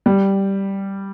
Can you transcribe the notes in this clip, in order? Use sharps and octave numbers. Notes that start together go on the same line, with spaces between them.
G3